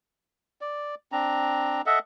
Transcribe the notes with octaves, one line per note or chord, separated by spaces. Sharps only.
D5
C4 D4 A#5
A4 D#5 E5 F#5